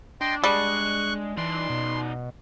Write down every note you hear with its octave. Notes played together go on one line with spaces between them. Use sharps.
D4 D#5 G5 C6
G3 G#3 C#6 F#6
E3 D#4 D5 C6
B2